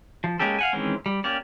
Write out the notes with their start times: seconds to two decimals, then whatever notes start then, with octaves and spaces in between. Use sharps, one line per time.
0.24 F3
0.39 G#3 A#3 C#4 G4 A4
0.59 F5 F#5 G#5
0.73 D#3 E3 G#3 C4 C#4
1.06 G3
1.24 A#3 C#4 G4 D5